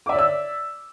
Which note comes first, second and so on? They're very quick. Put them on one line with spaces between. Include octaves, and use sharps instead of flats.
D6 E5 D5 C#5 E6